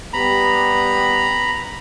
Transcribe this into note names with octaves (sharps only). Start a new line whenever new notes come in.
G3 B3 G4 A#5 B5